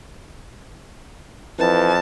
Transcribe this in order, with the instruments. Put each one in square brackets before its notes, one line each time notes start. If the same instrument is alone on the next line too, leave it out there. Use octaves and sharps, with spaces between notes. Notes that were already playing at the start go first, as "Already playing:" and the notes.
[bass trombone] F2 [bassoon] E3 [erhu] A5